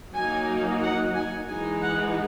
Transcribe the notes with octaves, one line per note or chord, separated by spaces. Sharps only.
F#3 A#3 D#4 G#5
F#5
G#5
E3 G#3 D#4 G#5
F#5